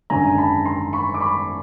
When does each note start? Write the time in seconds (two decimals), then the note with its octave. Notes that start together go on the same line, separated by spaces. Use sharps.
0.10 G#1 F#2 D3 G#5 A#5
0.38 A5 B5
0.65 A#5 C6
0.93 B5 C#6
1.14 D6
1.20 B5 C#6